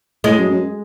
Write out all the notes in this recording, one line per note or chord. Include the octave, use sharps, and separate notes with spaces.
A2 G#3
F#2
F#2